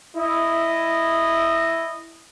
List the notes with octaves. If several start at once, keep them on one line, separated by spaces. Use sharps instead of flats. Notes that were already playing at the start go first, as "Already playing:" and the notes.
E4 D#5